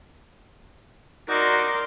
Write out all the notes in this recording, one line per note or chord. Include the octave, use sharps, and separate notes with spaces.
D#4 F#4 A#4 D5 C6